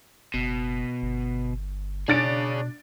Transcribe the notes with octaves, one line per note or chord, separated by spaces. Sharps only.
F#1 B2
G1
B2 D4 G#4 C#5 A6 D7